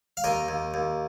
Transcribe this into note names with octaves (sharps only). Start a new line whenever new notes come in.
F5
D#2 A#4 D#5
D#2
D#2